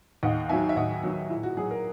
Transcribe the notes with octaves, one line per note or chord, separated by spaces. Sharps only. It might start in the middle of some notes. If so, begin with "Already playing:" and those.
D#2 D#5 F#5
D#3 F#3 E5 G#5
E5
D#2 D#5 F#5
D#3 F#3
A#2 E4
F#4
F#3 G#4
A#4